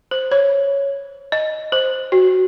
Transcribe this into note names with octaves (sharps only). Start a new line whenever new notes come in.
C5
C#5
D#5
C5
F#4